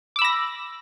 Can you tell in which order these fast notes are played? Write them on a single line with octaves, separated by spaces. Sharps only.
D6 E6 B5 A#6